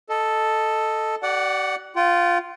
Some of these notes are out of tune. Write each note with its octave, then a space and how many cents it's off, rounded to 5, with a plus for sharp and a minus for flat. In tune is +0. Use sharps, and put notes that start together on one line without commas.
A4 +0 D#5 +0
G4 -45 D5 +0 F#5 +0
F4 +0 G5 -45